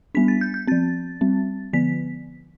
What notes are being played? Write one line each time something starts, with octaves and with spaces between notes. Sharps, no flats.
G3 B3 D4 B6
A6
G6
G6
F3 C4 A6
G3 C4
D3 F3 B3 B6